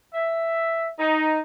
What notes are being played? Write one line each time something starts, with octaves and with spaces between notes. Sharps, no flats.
E5
D#4